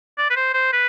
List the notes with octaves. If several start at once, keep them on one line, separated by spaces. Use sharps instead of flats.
D5
B4
C5
C5
B4